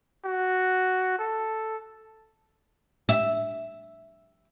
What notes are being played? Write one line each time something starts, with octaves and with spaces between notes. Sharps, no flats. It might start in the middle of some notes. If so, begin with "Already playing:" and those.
F#4
A4
E5